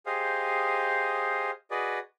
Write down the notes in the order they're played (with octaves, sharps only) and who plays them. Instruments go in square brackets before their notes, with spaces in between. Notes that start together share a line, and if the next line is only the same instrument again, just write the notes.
[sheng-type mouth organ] G4 G#4 C5 D#5 F5
F#4 G#4 B4 D5 D#5